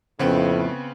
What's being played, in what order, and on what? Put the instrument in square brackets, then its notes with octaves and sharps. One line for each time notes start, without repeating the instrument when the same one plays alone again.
[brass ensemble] F2 A2 [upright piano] C#3 B3 C4